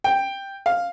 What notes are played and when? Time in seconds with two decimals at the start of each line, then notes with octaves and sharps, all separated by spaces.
0.04 G5
0.66 F5